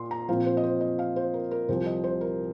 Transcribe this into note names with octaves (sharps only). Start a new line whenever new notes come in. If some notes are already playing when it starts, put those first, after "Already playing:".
Already playing: A#2 C6
A#5
A#2 F3 C4 F5
C5
D#5
C5
D#5
F5
C5
A#4
A#4
C2 C3 F3 C5
D#5
C5
A#4